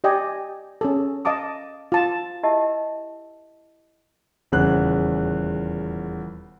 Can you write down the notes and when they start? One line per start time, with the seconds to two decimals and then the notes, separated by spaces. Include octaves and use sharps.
0.04 G4 D5 D#5 G5 G#5
0.81 C#4 G#4 A4
1.25 D#5 F5 A5 D6 D#6
1.92 F4 A5
2.43 E4 G4 A#4 D#5 E5 A5
4.52 D#1 E2 C#3 C5 F#6